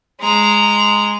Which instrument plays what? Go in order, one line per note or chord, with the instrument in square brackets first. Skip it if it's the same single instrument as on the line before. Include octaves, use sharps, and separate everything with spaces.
[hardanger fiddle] G#3 A#5